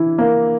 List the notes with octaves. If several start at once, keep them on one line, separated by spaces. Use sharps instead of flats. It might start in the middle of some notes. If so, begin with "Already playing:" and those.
Already playing: E3 E4
A#3